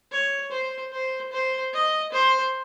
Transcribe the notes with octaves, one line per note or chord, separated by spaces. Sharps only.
C#5
C5
C5
C5
D#5
C5